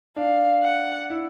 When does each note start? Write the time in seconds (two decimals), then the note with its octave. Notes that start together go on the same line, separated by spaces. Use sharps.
0.16 D4 F5
0.63 F#5
1.10 E4